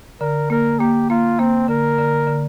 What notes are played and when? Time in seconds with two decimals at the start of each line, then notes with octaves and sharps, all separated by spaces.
0.21 D3 A#4
0.50 A#3 A#4
0.80 A#3 G4
1.10 A#3 F4
1.39 A#3 C4
1.68 D3 A#4
1.98 D3
2.27 D3